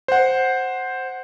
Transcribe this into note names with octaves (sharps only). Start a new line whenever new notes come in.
C5 F#5